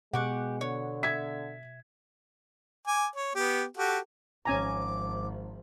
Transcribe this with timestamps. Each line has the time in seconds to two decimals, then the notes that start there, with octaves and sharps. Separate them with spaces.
0.14 B2 G#3 G4 F#5 C#6 D6
0.61 D3 C#5
1.03 E5 G#6 B6
2.87 G#5 D6
3.16 C#5
3.35 B3 G4
3.77 F#4 G4 A4
4.45 G#1 F3 C#4 G#5 A#5 D6